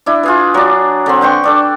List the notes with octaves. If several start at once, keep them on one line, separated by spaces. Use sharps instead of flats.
D4 E4
F4 G#4 B4
F#3 D4
D3 C4
B4 G5 C6 C#6
D4 A4 D6